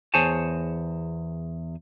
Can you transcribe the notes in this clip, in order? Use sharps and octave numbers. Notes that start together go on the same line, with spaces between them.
E2 G#4 C5 C#5 G#5 A5